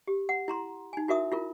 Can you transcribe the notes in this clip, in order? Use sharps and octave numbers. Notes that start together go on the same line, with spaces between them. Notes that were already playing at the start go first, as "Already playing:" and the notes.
G4
F#5
E4 A#5 C6
D#4 G#5
E4 F#4 A#4 E5 D#6
E4 F4 A#4